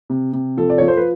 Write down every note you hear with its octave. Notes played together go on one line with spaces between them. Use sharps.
C3
C3
F3 A4
D5
F3 C#5
C5
B4